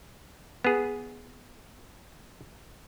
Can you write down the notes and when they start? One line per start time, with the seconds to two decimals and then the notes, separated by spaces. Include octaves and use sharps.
0.64 B3 G#4